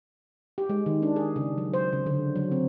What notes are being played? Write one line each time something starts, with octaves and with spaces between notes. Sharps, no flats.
G4
G#3
D#3
D4
G#4
C#3
F#3
C5
C#3
D3
F#3
C4